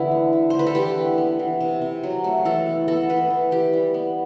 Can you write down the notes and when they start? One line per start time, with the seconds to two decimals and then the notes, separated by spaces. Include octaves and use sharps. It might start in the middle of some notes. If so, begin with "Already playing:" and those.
Already playing: D3 E3 B3 E4
0.11 A3
0.33 A3
0.50 D3 C5
0.59 B4
0.67 A4
0.75 E3 G4
0.97 B3
1.18 B3
1.39 E3
1.60 C3
1.81 C3
2.03 F#3
2.24 A3
2.45 E3 A4
2.66 B3
2.88 B3 A4
3.09 E3 B4
3.30 E3
3.51 E3 G4
3.73 G3
3.94 B3